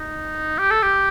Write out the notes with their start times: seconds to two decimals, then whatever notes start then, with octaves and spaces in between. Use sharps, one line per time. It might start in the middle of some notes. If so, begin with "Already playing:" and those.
Already playing: D#4
0.58 G4
0.70 A4
0.82 G4